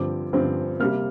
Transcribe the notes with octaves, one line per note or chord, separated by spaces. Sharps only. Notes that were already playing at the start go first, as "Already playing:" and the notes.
Already playing: G2 D3 F3 C4 D6
G2 D3 F3 C4
C3 G3 A#3 F6